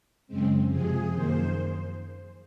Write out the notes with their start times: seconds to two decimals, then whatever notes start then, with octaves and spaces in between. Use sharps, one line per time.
0.27 F#2 C#3 G#3 C4
0.69 F2 C3 F3 G#4
1.10 F#2 D#3 A#3 C5